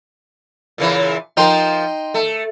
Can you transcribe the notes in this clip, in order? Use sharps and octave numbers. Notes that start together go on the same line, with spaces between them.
A#2 C#3 E3
F3 D#4 A#4 G5 C6
A3